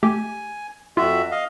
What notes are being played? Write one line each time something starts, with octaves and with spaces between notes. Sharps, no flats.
A3 G4 G#5
F2 F4 F#4 E5
D#5 F5